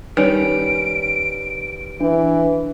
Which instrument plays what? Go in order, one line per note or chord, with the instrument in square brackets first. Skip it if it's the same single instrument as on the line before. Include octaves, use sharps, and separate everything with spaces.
[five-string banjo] D#3 G3 C#4 [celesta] B4 [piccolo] D7
[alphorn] E3 [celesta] D4